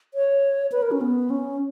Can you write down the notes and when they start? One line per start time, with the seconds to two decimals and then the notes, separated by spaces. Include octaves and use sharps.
0.14 C#5
0.72 B4
0.82 A#4
0.92 C#4
1.01 B3
1.30 C#4